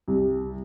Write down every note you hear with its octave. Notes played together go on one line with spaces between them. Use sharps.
C2